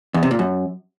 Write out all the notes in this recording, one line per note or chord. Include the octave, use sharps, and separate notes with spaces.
E2
C3
A#2
F#2